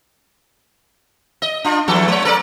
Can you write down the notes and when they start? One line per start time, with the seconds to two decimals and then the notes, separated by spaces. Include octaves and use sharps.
1.42 D#5
1.64 D4 F4
1.88 E2 F3 A4
2.08 G#3 C#5
2.25 A4 A#4 D5